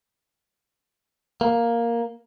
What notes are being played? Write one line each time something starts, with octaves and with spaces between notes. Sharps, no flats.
A#3